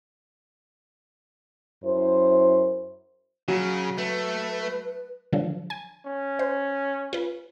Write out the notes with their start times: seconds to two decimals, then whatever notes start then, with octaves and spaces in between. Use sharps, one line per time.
1.84 F#2 E4 C5
3.48 C#3 F#3
3.98 A3 B4
5.33 D3 F3 F#3
5.70 G#5
6.06 C#4
6.39 C5
7.13 F4 B4